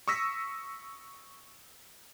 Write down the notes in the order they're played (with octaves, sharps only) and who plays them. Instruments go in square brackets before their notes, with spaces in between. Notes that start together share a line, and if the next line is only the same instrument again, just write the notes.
[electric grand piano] C#6 D#6 E6 A#6 B6